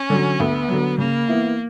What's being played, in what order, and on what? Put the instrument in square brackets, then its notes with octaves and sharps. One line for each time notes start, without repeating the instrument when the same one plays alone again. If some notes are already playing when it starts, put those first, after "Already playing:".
Already playing: [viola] C#4
[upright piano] D3 F#3
[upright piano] D2 [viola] B3
[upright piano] D3 F#3
[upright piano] C#3 [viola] A#3
[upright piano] E3 B3 E4